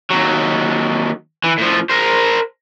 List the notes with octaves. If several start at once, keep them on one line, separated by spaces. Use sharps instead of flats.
D#2 F#3
E3
A2 F3
A#4 C5